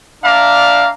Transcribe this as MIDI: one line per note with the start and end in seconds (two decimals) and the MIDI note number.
0.24 0.91 62
0.24 0.91 74
0.24 0.91 76
0.24 0.91 77
0.24 0.91 82